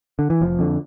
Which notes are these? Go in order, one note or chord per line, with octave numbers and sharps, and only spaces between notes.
D3
E3
F1 F3
F2 D3